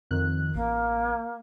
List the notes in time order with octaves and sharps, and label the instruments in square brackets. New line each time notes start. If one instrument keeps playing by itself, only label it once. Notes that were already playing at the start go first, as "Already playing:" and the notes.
[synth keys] F2 D#3 F#6
[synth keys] A1 [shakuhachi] A#3